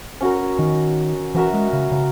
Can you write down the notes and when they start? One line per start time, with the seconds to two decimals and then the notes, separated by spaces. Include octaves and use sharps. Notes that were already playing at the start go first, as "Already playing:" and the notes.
0.21 C#4 F#4 A#4
0.59 D#3
1.34 E3 C#4 F#4 A#4 E5
1.53 G#3
1.73 C#3
1.92 C#3